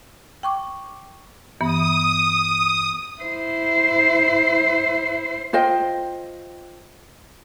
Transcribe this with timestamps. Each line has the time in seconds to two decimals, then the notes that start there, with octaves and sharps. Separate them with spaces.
0.43 G5 C#6 D6
1.61 G2 E3 B3 D#6
3.22 E4 C5
5.53 F4 C5 D#5 G5